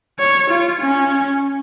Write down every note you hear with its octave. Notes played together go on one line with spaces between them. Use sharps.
C#5
F4
C#4